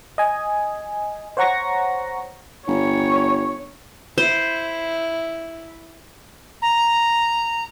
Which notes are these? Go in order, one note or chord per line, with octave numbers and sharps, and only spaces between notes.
D#5 G#5
C5 C#5 F#5 A#5 C#6 A#6
G1 C#5
E4 C5
A#5